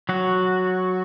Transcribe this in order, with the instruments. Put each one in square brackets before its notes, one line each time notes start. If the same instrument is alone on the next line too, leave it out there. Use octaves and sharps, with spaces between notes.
[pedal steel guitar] F#3 F#4